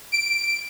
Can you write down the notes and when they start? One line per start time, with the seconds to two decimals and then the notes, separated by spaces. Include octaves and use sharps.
0.12 D7